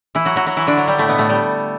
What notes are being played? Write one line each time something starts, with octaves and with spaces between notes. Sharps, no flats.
E3 E4
F#3 F#4
F#3 F#4
F#3 F#4
E3 E4
D3 D4
F#3
G3
A2 A3
B2 B3
A2 A3
G3